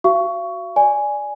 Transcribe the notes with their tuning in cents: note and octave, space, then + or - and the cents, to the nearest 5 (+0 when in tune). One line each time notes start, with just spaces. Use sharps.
F#4 +5 F5 -40 C#6 +15
D5 +0 G#5 +0